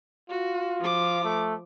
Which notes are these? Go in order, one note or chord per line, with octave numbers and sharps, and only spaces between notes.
F4 F#4
F3 D6
A3